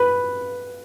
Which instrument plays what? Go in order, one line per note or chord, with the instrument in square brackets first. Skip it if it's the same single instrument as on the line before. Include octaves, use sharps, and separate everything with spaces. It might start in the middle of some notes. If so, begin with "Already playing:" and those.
Already playing: [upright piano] B4